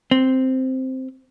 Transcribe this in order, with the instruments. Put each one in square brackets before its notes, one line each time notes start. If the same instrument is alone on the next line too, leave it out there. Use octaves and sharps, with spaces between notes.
[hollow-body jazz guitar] C4